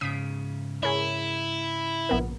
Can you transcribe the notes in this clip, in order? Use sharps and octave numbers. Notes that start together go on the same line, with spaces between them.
G#2 C#3 D#6 B6 D7
E4 G#4 A#4 C#5
A#1 B3 A#4